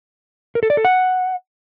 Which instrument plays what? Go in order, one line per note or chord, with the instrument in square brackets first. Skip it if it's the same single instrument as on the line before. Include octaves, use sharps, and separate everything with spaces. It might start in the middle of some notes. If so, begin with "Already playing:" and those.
[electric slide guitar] A#4
A4
D5
A4
F#5